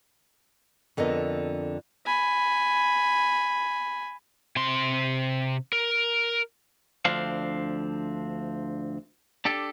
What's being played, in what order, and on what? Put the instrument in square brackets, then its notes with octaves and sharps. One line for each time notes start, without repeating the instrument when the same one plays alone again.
[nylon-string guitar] F2 D3 B3 A#4 D#5
[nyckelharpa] G#5 B5
[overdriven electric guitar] C3 C6
A#4
[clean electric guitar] D2 F3 C4 D4 F5
D4 G4 A4